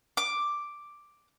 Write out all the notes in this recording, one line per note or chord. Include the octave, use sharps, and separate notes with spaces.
D6